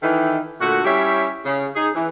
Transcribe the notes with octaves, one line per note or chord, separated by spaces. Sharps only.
D#3 E3 D#4 E4 A4 B4
A#2 D3 A3 F#4
G3 C#4 E4 G4 C#5 E5
C#3
D#4 G#4
E3